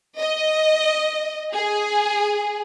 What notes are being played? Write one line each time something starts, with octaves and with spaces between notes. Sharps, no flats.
D#5
G#4